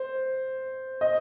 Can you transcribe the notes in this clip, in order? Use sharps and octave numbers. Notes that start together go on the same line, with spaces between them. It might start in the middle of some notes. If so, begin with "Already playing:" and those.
Already playing: C5
D#5